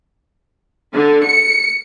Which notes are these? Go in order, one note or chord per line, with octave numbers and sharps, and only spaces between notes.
D3
C#7